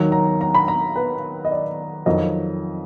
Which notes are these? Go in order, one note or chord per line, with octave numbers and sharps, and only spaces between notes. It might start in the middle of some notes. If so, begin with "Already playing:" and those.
Already playing: D#2 D#3 F#3
A#5
A#5
B5
A#5
B4
D#5
D5
F2 D#3 F#3 D#5